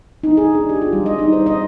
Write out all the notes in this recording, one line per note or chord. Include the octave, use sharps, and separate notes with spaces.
D#4
G#4
D4
G4
F4
G3
D#5
D#4
C5
D#5